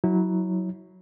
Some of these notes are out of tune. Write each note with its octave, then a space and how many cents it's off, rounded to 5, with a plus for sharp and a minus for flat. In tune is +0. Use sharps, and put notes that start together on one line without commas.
F#3 +0 E4 -30